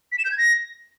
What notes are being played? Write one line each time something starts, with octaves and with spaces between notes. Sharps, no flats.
B6
E7
G6
G#6
A#6